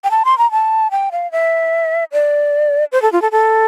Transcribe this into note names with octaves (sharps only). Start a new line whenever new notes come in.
G5
A5
C6
A#5
A5
G5
F5
E5
D5
C5
A4
F4
A4
A4